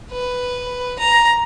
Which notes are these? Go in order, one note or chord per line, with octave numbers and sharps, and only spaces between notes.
B4
A#5